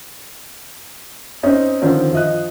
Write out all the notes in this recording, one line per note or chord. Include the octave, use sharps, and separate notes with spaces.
C4 C#4 D#4
D3 D#3 F3 C4 C#4
F3 D#5 F#6